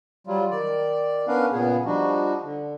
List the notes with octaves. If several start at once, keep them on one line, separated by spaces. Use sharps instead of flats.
F#3 G3 F4
D#3 D5
B3 C#4 D4 A#4 B4 F5
A#2 C#3 B3 G#4
F3 G3 D4 D#4 F#4
D3